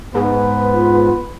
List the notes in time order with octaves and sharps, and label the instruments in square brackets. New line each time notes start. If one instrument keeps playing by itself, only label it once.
[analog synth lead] G#2 [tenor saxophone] B3 [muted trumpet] B4
[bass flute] F4